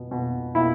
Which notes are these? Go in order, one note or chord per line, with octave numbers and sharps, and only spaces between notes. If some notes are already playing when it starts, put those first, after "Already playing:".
Already playing: B2
B2
B2 E4